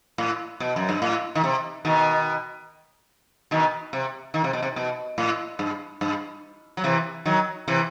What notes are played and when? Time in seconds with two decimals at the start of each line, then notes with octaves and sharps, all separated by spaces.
0.18 A2
0.60 B2
0.76 F#2
0.89 G2
1.02 A2
1.35 D#3
1.44 C3
1.85 B2 D#3
3.51 B2 D#3
3.93 C3
4.34 D#3
4.44 C3
4.53 B2
4.62 C3
4.76 B2
5.18 A2
5.59 G2
6.01 G2
6.77 F#3
6.84 C3 E3
7.25 D#3 F#3
7.68 C3 E3